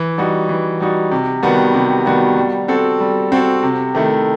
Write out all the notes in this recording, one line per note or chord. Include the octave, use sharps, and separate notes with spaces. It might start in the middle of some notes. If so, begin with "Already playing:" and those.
Already playing: E3
G3 D#4 F#4
E3
G3 D#4 F#4
C3
D#3 G3 B3 F#4
C3
D#3 G3 B3 F#4
G3
C4 F#4 A4
G3
C4 F#4 A4
C3
D#3 A3 E4